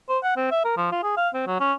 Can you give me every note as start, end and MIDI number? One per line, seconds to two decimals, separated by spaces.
0.09 0.19 72
0.23 0.33 78
0.36 0.49 60
0.51 0.61 76
0.65 0.74 70
0.77 0.88 53
0.92 1.02 65
1.03 1.13 68
1.17 1.29 77
1.34 1.43 60
1.47 1.59 54
1.60 1.73 61